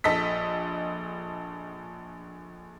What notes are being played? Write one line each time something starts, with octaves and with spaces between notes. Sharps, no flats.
A#1 A4 D#5 B6